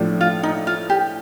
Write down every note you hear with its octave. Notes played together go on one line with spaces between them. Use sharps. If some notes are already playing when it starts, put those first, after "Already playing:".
Already playing: A2 F3 A3 D4
F4
D#4
F4
G4